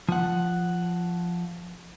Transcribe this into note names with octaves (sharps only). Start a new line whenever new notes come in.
F3 F#5